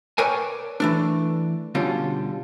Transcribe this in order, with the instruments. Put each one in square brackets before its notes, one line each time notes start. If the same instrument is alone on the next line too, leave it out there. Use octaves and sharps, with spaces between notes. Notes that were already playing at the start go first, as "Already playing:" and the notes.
[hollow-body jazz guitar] A#4 B4 C#5 D5 G5 G#5
E3 A3 D4
B2 D3 G3 C#4 F4